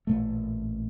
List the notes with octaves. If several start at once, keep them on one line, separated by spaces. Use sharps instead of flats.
A1 A#2 A3